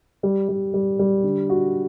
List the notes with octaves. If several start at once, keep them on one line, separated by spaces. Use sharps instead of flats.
G3
G3
G3
G3
D3
F#4